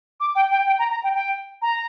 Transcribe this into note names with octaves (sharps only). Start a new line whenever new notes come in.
D6
G5
G5
G5
A#5
A#5
G5
G5
A#5